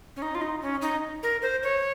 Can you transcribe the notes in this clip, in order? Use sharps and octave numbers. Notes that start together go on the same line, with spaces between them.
C#4
D#4
F4
D#4
C#4
D#4
A#4
C5
C#5